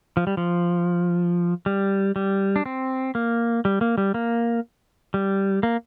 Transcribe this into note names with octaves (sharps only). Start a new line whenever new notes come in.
F3
G3
F3
G3
G3
D4
C4
A#3
G3
A#3
G3
A#3
G3
A#3